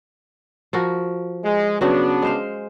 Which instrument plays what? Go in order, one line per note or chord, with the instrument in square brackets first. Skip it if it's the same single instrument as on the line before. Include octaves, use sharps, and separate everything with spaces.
[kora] F3 F#4 A#4
[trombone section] G#3
[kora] C#3 F#3 F#4 [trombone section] B3 D4
[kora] G#3 C5 F5